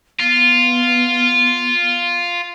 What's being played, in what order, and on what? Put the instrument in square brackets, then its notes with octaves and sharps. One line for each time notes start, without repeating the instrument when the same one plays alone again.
[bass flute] B3 [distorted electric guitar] F4